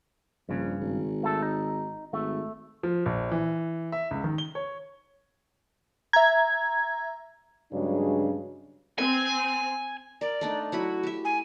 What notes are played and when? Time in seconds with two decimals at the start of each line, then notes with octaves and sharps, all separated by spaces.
0.49 A#1 G2 C#3
0.81 G#1
1.23 A3 A4
1.42 D#4
2.13 G#1 A3
2.83 F3
3.06 A#1
3.32 E3
3.92 E5
4.11 C#2
4.24 D#3
4.38 G7
4.55 C#5
6.13 E5 A#5 G#6
7.72 G2 C#3 F#3 G#3 D4
8.98 C4 G#5
10.21 A#4 D5
10.41 A3 D4 D#4
10.72 F#3 E4 F#4 B5
11.03 G4 E5
11.25 G#5